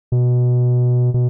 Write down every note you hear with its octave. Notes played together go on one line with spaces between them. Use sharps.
B2
B2